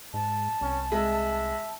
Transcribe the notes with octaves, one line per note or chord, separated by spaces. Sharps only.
G#2 A5
C2 C#4
G#3 E5